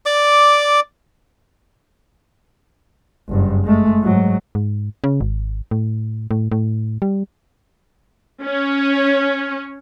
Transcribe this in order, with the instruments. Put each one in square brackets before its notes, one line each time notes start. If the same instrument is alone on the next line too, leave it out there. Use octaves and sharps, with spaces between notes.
[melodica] D5 D6
[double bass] F#1 G2
G#3 A3
G#2 F#3
[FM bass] G#2
C#3
G#1
A2
A2
A2
G3
[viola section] C#4